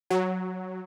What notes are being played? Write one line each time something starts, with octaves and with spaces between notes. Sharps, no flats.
F#3